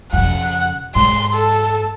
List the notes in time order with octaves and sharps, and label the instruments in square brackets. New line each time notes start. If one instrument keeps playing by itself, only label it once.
[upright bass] F2 C#3 [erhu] F#5
[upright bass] G#2 [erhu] C6
[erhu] A4